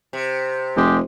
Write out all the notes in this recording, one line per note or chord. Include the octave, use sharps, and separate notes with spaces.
C3
F1 G#3 G4